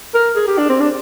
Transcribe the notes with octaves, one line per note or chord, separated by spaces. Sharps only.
A#4
G#4
G4
D4
C4
D4